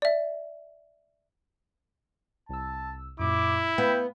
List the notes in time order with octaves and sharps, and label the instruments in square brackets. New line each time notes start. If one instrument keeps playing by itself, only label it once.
[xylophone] D5 E5
[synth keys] C2 E6 [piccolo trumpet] A5
[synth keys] F#2 A#2 [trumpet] E4 [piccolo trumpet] D6
[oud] B3 [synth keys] F5 [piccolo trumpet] G5